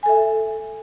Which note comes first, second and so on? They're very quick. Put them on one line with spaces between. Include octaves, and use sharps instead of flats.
G#5 A4 E5